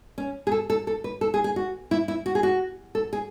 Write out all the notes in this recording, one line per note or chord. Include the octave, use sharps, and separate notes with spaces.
C#4
G#4
A4
A4
A4
B4
A4
G#4
G#4
F#4
E4
E4
F#4
G#4
F#4
A4
G#4